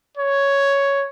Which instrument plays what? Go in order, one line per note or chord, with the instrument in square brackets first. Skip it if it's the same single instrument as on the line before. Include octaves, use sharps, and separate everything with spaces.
[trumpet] C#5